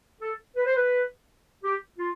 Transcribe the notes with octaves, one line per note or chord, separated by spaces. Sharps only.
A4
B4
C5
B4
G4
F4